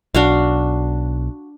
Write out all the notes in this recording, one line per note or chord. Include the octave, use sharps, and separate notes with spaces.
B1 D4 F#4 F5